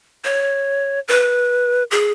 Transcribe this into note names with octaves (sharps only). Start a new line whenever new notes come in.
C#5
B4
G#4